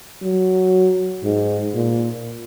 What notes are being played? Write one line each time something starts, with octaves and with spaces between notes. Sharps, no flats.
F#3
G#2
A#2